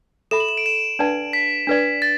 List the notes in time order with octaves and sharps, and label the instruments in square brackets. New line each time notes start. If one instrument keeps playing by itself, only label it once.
[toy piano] A4 E5 B5 [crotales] E7
[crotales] F#7
E7
D7
E7
[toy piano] D4 B4 D5 F#5 A5
[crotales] B6
[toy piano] D4 B4 D5
[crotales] A6